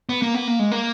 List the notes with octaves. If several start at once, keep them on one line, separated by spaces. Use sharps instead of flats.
B3
A#3
B3
A#3
G#3
A#3